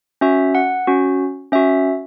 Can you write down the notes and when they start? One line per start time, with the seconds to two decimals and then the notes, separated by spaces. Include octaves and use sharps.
0.21 C#4 F#4 E5
0.55 F#5
0.87 C#4 F#4
1.52 C#4 F#4 E5